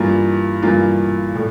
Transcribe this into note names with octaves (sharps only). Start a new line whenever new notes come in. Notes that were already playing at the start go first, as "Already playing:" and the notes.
Already playing: G2 E3 A#3 F4
G2 E3 A#3 F4
A2